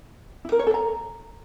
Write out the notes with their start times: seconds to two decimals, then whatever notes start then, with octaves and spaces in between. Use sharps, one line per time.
0.45 E4
0.52 A#4
0.59 C#5
0.67 A4
0.74 A#5